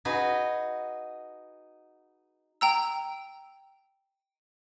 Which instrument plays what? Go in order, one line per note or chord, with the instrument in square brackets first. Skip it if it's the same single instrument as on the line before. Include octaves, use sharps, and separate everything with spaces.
[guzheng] D#4 F#4 G#4 B4
[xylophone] G5 A#5 E6